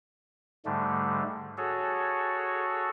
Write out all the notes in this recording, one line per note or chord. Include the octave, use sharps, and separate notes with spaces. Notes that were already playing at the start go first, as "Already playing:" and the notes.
G#2 D3 G3 A3
F#4 G#4 A4 C#5